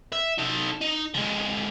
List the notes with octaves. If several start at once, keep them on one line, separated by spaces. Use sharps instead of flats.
E5
D#4 A4
D#4
D3 G#3